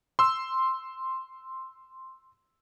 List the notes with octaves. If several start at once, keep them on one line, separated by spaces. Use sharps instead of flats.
C6 E6